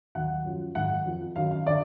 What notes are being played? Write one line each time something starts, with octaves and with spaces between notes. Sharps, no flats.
D#2 D#3 F#3 F#5
F#2 F3
G#2 D#3 F#3 F#5
F2 F3
F#2 D#3 F#3 F5
F5
D3 D5